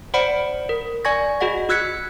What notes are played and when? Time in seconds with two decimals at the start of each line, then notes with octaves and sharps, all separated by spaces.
0.14 C5 D5 F#5 B5 C#7 D7
0.69 A#4
1.05 D5 G#5 C#6 G#6 A#6
1.40 F#4 G#4 D#5 F#5 A#6
1.69 F#4 E6 F#6 G#6 B6 C#7